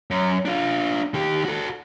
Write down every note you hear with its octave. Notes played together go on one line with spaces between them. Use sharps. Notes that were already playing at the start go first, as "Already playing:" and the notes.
F#2
D4 F4
D#3 G4
F#4 A4